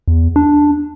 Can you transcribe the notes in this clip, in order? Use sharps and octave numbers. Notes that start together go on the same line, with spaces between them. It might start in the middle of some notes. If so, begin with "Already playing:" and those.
E2
D4